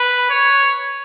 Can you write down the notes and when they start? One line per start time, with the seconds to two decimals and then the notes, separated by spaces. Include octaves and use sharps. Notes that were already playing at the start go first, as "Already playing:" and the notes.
Already playing: B4
0.30 C#5